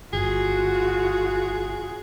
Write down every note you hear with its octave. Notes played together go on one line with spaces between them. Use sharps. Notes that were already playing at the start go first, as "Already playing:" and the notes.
G1 F4 F#4 G#4